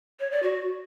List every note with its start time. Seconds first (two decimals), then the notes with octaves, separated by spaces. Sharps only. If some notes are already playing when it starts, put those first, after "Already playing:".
0.20 C#5
0.31 D5
0.43 F#4